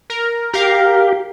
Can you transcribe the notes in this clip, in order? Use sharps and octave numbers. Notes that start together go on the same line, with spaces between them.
A#4
G4 A#4 F5